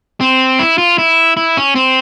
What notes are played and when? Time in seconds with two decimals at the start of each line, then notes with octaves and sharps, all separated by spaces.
0.21 C4
0.59 E4
0.78 F4
0.98 E4
1.37 E4
1.57 C#4
1.75 C4